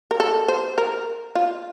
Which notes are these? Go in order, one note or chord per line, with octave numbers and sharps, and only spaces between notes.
A#4
A4
C5
A#4
F4